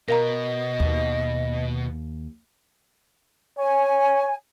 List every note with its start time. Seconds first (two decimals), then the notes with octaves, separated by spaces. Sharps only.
0.08 B2 A#4 D#5 F5 A#5
0.80 D#2
3.58 C#5 G#5